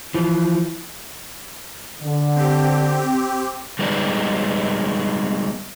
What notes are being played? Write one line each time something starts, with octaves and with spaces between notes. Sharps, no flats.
E3 F3
D3
C4 G4
G3 G#3 B3 D#4 D5